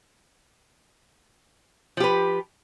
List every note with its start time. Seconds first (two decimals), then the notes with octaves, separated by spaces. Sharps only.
1.97 F3
2.00 G4
2.04 B4